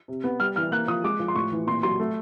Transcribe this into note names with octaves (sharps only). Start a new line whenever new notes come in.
C3
B3
G3 F6
E3 F6
A#3 F#6
F3 D#6
G#3 D6
F3
C6
A2 C#6
E3
A#2 C6
F#3 C6
A3